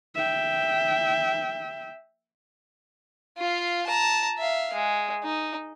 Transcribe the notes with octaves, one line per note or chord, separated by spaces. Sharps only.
E5 G5
F4 F5
A5 A#5
E5 F5
G#3
D#4